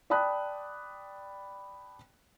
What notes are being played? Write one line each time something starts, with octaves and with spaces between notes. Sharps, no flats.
D5 G5 A5 B5 D#6 F#6